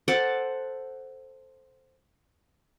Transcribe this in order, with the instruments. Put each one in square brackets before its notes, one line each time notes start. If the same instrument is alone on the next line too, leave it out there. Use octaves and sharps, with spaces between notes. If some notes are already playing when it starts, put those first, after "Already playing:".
[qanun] A4 C5 F#5 D6